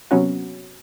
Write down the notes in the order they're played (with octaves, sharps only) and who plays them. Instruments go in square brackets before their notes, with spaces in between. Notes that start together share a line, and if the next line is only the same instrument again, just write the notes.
[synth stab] C3 F#3 B3 C#4 F#4